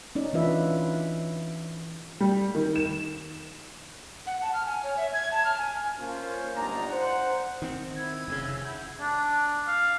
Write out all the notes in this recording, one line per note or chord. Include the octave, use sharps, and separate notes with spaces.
C#4 D#4 D5
E3 C#4 D4 F4 B4 E5
G3
D#3
E7
F#5
A5
F6
G#5
C#5
E5
G#6
A5
F6
G#5
A#3 C#4 F4 C5
G1 C#2 D4 D#4 D5 A#5
C5 F#5
D#3 C4
E4 E6 G#6
F1 C#3
E4 F#5 G6
D4
F5